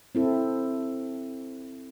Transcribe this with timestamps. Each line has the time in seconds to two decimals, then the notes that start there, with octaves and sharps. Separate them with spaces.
0.15 C4 E4 A4